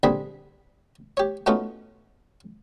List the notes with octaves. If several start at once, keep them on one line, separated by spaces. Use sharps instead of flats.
A#1 D3 G3 C4 G#4 B5
G4 C#5
A3 B3 C#4 D#4 F4 F#4